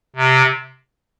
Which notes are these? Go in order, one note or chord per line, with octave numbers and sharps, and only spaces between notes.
C3